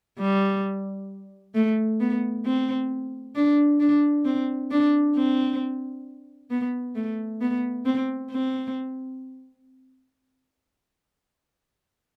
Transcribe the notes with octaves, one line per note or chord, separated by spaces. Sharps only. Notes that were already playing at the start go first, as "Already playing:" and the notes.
G3
A3
B3
C4
D4
D4
C4
D4
C4
B3
A3
B3
C4
C4